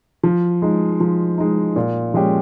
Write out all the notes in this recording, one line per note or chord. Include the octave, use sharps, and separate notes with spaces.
F3
G#3 D#4
F3
G#3 D#4
A#2
F3 G#3 C#4 G4